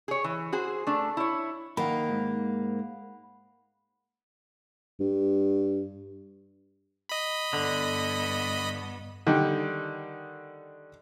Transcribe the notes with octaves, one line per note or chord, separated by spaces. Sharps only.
G#4 C#5
E3
F#4 G#4 C5
A3 D4
E4 C#5
D#3 A#3 D#4 F#5 B5
G#2
G2
D#5 B5
G2 D3 B3
D3 D#3 G3 D#4